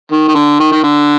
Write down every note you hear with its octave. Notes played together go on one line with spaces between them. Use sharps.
D#3
D#3
D3
D#3
D#3
D3